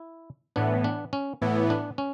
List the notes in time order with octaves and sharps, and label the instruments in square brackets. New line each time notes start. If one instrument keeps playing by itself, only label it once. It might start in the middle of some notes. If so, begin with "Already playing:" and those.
Already playing: [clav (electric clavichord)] E4
[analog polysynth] A2 E3 B3 [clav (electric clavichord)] D4
[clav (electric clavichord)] D4
C#4
[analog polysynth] A2 E3 B3
[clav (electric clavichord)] D4
C#4